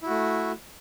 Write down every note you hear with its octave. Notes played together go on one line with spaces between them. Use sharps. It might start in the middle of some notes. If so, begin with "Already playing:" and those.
A3 E4 F#4